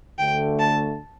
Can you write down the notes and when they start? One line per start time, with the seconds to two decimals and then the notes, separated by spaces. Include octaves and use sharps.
0.19 D2 D3 A3 G5
0.59 A5